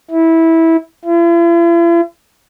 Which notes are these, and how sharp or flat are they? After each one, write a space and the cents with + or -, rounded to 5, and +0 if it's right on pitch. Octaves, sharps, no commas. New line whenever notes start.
E4 -15
E4 +45